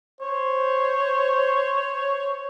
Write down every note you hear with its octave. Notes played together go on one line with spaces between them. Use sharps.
C5 C#5